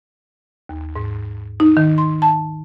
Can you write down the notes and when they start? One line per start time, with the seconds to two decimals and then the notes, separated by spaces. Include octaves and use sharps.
0.69 D#2
0.96 G#2
1.60 D#4
1.77 D#3
1.98 C6
2.22 A5